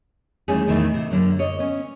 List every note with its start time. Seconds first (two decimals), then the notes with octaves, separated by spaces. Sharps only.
0.48 D#2 E3 G3 A3 C#4 G#4
0.68 E2 A2 D#3 E3 G#3 A3
0.94 C3
1.11 F#2 D3 A#3
1.39 C#5 D#5
1.59 B3 C#4